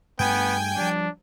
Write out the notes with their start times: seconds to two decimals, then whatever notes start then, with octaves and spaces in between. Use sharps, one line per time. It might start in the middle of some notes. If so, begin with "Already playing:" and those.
0.19 G2 A3 B3 G5 G#5
0.77 F3 G3 D4